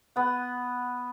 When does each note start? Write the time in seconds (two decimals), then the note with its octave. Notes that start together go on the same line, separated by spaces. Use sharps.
0.16 B3 F#5